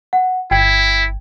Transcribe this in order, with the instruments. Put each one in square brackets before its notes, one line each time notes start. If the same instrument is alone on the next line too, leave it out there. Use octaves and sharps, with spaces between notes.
[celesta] F#5
[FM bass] G1 [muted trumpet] E4 [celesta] G5 G#6